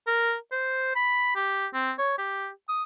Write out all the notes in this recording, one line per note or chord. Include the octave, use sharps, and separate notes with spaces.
A#4
C5
B5
G4
C4
C#5
G4
D#6